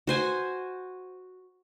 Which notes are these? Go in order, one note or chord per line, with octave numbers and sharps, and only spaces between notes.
F#4 C5 G#5